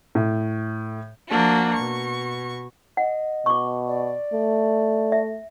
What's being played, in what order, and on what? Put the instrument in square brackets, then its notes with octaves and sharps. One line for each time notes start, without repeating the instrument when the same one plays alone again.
[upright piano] A2
[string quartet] F3 A#3 D4 F#4
B2 C#6
[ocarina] D#5 [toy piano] F#5
[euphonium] B2 [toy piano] C#6 D6
[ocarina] D5
[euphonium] A3
[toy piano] E5